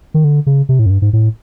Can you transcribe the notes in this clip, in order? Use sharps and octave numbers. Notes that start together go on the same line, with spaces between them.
D#3
D3
C#3
C3
A2
F#2
G2
G#2
A2